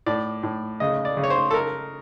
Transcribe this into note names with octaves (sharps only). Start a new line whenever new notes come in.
A2 D5
A2
C#3 D#5
D5
C#3
C#5
C5
A4
A#4